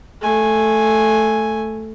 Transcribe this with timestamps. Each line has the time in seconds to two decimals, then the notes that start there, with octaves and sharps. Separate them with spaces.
0.22 A3 G#5